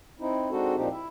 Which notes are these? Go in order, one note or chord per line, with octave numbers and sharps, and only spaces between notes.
C4 D#4 E4
G#3 C4 D4 D#4 F#4 A4
A#2 F3 C4 D4 D#4 G4
E4 E5